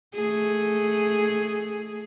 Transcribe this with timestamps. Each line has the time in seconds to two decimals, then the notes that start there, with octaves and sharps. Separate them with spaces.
0.15 A3 G#4